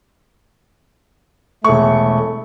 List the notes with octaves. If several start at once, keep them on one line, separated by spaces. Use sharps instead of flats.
E1 A3 C#6